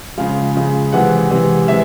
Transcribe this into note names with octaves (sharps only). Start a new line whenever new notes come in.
C#3 F3 G#3 F5
C#3 F3 G#3
C3 E3 G#3 F#5
C3 E3 G#3
C3 E3 G#3 E5